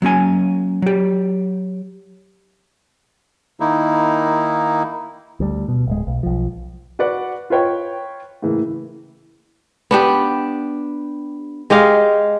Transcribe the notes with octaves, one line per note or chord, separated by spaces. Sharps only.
F#3 A#3 C#4 G#5
F#3 G4
D#3 A#3 D#4 E4
D2 G3
B2
D1 G#3
B1
B1 F3
F#4 B4 D5 F#5
F4 B4 C#5 G5
A2 C#3 E3 A#3
B3 D4 G4
G#3 G4 D#5 F5